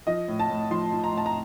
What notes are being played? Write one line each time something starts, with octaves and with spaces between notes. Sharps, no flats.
F3 D#5
A2
A5
A2
F3 C6
F3
A#5
A2 A5
A#5